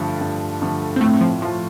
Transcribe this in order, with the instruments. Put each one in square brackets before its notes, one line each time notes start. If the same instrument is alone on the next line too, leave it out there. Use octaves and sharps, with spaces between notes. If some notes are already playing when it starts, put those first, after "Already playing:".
Already playing: [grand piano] G2 D3 F3 A3
G2
D3 F3 A3
[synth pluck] C4
[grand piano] A2 [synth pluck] A3
[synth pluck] F3
[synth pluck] F3 [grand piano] A3
[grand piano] F4